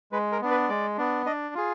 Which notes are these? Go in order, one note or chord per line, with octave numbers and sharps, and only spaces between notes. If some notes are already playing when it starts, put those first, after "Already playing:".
G#3 B4
A#4
B3 D4
B4
G#3 D5
B3 D4
D4 D#5
F4 G#4